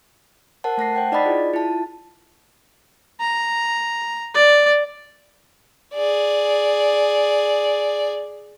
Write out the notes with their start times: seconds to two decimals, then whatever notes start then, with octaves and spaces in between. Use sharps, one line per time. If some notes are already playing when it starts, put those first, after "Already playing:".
0.64 A#4 C5 F#5 A5
0.78 A3 A5 A#6 C7
0.95 C5 F#5 G5 A5
1.12 D#4 D5 D#5 B5 A6 B6
1.26 E4 F4 G#4
1.54 E4 F4 A5
3.20 A#5
4.34 D5
5.94 G#4 D5